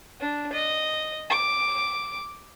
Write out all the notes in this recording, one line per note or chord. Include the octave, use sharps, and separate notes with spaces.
D4
D#5
D6